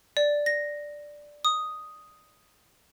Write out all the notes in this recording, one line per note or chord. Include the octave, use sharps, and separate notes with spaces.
D5
A#6
D#6